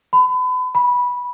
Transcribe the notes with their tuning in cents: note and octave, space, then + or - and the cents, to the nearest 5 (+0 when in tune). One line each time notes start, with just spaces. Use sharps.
B5 +35
B5 -10